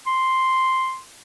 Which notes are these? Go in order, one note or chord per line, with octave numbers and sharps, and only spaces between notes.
C6